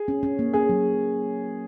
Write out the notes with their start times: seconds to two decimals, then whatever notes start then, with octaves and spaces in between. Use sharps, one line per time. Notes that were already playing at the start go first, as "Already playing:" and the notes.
Already playing: G#4
0.08 C#4
0.23 C#4
0.39 A#3
0.53 C#4 G#4
0.69 F#3